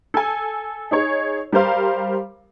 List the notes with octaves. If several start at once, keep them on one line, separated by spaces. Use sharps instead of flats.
A4 G#5
D#4 G#4 C#5
G3 A#4 C5 F5